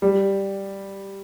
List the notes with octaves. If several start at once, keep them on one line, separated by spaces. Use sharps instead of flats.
G3